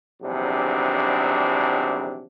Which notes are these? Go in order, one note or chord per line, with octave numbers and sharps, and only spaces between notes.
A#1 E2 C3 D#3 F#3 D4